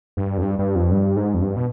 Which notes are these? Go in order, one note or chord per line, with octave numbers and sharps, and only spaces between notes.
G2
F2
G2
G2
F2
G2
G#2
F2
G2
B2